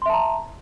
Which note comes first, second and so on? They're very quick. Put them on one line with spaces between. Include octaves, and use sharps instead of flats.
C6 E5 A5 A#5